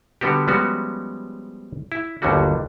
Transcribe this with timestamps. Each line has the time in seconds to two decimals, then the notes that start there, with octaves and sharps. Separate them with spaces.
0.21 D3 G3 B3 F#4 G4
0.47 F3 G3 G#3 B3 C#4 F#4
1.92 E4
2.22 G1 D#2 D3 F#3 G3 F#4